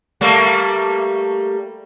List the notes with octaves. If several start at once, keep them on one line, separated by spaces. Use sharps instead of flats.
G3 A3 A#3